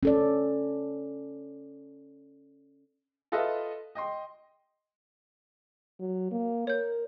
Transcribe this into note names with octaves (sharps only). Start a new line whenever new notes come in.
C#4 A4 D5
F4 A4 B4 D#5 E5
D#5 G5 C6
F#3
A#3
A#4 C#5 G6